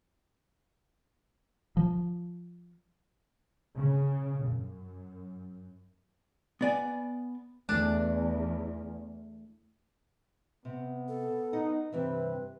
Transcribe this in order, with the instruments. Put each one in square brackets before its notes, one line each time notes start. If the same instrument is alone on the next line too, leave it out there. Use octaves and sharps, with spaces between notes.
[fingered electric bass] F3
[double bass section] C#3
F#2
[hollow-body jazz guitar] B3 D5 G#5
[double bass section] E2 [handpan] A3 [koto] D4
[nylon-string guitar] C3 [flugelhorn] B3
[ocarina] A4
[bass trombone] D#4 [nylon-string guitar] D#5 F#5
[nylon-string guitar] G2 E3 E5 [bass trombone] C3 [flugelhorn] C4 [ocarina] B4